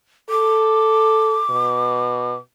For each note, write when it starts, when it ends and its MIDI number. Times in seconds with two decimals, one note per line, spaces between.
0.30 1.40 69
0.30 2.35 86
1.50 2.35 47